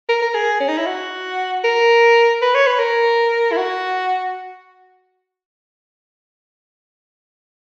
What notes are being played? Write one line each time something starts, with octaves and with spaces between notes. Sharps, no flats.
A#4
A#4
G#4
C#4
D#4
E4
F#4
A#4
B4
C#5
B4
A#4
E4
F#4